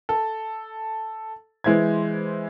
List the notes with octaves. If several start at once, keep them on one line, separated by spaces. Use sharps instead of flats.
A4
E3 G#3 E4 C5 G#6